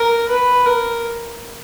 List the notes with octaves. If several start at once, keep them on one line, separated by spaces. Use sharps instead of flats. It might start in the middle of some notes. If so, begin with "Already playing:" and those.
Already playing: A#4
B4
A#4